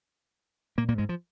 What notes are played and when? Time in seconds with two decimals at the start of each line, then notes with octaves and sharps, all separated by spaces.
0.78 A#2 A#3
0.88 A#2 A#3
0.98 G#2 G#3
1.09 F3